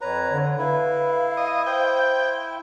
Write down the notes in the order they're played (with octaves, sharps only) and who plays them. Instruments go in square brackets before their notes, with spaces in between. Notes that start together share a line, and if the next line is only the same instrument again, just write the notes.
[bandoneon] F2 B4 A#5 [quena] C#5
[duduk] D3
[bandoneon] E4 [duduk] B4 [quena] F5
[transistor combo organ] D#5
[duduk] C5 [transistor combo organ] G5